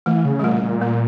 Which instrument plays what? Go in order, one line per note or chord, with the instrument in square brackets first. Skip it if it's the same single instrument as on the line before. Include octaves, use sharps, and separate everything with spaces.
[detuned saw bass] E3 [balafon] A3
[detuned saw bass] C#3
[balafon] G3
[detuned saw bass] A#2 [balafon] A3
[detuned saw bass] A#2
[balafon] A#3